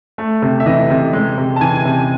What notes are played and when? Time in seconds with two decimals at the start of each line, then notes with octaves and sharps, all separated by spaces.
0.18 A3
0.42 C3
0.60 E5
0.66 E3 D#5
0.90 C3
1.13 G#3
1.38 C3
1.56 A5
1.61 E3 G#5
1.85 C3